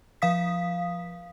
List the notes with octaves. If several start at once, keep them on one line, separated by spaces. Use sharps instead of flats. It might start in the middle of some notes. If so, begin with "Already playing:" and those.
F3 F5 D#6 B6